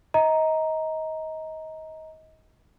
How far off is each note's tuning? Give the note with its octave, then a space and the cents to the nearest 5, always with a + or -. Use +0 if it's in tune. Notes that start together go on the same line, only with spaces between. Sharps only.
D#5 +25 A#5 +0